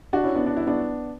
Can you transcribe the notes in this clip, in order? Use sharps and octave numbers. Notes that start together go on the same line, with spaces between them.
D4 F#4
C#4 E4
B3 D4
D4
E4
B3 D4